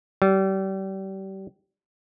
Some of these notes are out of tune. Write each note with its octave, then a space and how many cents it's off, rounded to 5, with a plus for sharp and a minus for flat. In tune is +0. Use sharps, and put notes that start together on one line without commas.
G3 -30